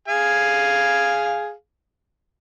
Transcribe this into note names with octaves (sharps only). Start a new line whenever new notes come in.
G#4 F5 G#5